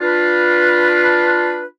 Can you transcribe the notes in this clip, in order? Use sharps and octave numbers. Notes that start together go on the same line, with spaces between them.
D4 F4 B4